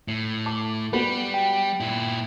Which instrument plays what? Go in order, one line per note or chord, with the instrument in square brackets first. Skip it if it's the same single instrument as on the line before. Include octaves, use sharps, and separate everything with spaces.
[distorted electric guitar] A2
[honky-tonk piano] A5 D6
[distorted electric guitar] G3 [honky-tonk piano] B3 F#4 B4
[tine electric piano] G5
[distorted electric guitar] A#2 E4